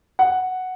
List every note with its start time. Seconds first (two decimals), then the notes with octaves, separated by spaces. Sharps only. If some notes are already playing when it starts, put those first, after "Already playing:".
0.19 F#5